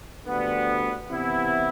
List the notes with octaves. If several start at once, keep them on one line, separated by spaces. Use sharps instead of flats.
D2 D3 G3 B3
C3 E3 B3 E4